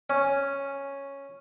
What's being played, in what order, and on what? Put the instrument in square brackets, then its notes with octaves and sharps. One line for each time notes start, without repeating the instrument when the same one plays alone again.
[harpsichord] C#4